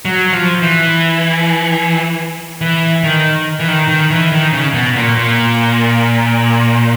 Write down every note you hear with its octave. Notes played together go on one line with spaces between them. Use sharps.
F#3
F3
E3
E3
D#3
E3
D#3
D#3
E3
D#3
C#3
B2
A#2
A#2